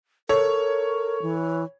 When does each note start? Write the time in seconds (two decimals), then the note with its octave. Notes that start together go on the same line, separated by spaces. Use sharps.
0.29 A4 A#4 C#5
1.22 E3